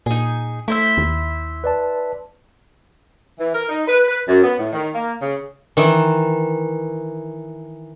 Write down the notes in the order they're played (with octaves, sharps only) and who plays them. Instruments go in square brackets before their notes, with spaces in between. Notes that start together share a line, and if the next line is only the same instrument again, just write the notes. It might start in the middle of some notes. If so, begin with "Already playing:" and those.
[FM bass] A#2 [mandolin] D#4 G#4
[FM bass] A3 [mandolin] E4 C5 E5
[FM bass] D#2
[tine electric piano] B4 D5 A5
[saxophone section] E3
A#4
D#4
B4
B4
F#2
B3
A2
D#3
A#3
C#3
[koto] D#3 E3